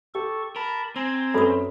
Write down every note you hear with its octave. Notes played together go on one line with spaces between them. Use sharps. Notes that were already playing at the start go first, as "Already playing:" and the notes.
G4 A4 C#6
A#4 A5 B5
C4 G#5 A#5 C6
F#2 A4 B4 B5 D#6